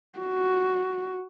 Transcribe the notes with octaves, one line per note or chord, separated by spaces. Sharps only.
F#4